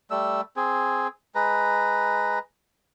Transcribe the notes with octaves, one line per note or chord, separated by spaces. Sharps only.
G3 A3 E6
C4 G#4
G#3 B4 A#5